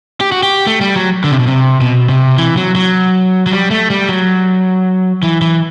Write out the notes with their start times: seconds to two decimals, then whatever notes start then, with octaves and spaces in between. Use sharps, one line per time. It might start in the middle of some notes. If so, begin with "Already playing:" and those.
0.21 G4
0.32 F#4
0.43 G4
0.67 A3
0.81 G3
0.96 F#3
1.24 D3
1.31 C3
1.39 B2
1.47 C3
1.81 B2
2.09 C3
2.38 E3
2.57 F#3
2.75 F#3
3.46 F#3
3.52 G3
3.71 A3
3.90 G3
4.09 F#3
5.23 E3
5.42 E3